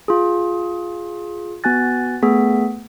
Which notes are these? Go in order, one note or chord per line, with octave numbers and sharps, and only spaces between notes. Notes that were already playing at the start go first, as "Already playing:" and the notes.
F4 G#4
B3 F#4 G#5 F#6 A6
A3 B3 G#4 B6